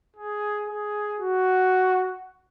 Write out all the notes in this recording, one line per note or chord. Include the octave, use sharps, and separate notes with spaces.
G#4
G#4
F#4